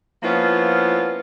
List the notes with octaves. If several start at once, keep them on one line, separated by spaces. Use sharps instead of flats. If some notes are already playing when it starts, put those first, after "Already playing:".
F3 A#3 B3 C#4 E4 F4